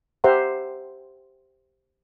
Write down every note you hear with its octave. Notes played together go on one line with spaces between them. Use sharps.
G4 C5 E5 F#5 A#5 C6